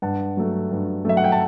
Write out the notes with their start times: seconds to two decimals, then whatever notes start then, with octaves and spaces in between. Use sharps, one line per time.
0.02 G2 F#5 A5
0.37 F#3 A3
0.71 G2
1.05 F#3 A3 E5
1.17 F#5
1.24 G5
1.32 A5